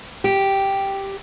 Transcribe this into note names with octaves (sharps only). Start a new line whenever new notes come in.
G4